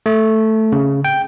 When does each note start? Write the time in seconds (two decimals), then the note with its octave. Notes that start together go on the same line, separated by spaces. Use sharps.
0.06 A3
0.72 C#3
1.05 G5